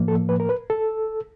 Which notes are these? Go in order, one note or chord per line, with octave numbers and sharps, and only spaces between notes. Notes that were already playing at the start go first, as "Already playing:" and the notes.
Already playing: A2 F3 A#3
A4
B4
A#4
B4
A4